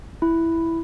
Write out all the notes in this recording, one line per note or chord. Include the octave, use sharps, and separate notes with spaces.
E4